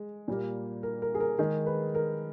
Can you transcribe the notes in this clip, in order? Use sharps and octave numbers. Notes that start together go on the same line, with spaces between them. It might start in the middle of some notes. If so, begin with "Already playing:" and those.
Already playing: G#3
A#2 G3 A#3
A#4
A#4
G#4
A#4
D#3 G#3 G#4
B4
A#4